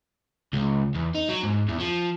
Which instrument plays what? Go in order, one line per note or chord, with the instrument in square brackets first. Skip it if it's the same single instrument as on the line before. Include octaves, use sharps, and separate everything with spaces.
[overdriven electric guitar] C#2
E2
D#4
F#3
G#2
E2
F3